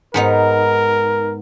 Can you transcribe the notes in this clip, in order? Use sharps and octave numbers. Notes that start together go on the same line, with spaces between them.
G#2 B3 D#4 A#4